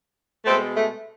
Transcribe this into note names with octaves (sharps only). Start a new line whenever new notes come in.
B2 G#3 A3 C4
A3